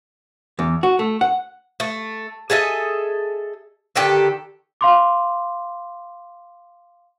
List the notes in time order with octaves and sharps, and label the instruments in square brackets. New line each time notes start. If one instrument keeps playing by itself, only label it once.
[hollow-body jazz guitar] E2
F#4
A3
F#5
[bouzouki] A3
G#4 A4 D#5 E5
D3 D#3 G4 A4
[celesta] F5 C6 D6